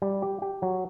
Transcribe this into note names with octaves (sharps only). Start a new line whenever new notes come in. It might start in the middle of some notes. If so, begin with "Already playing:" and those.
G3
G4
G4
F#3